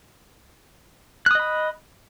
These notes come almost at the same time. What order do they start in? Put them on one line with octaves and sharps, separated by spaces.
F#6 D#6 D#5 B5